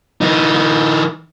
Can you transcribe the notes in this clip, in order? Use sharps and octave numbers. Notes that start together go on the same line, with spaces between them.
E3 D#4